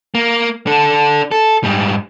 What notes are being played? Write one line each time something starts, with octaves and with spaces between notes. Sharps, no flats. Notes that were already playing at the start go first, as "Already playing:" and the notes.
A#3
D4 A4
A4
G#2 G3